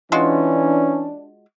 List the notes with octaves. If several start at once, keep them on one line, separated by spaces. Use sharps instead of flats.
E3 G#3 C#4 D4 F4 F#4